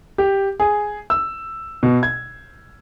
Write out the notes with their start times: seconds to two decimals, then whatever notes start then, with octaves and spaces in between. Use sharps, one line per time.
0.18 G4
0.60 G#4
1.10 E6
1.83 B2
2.03 G#6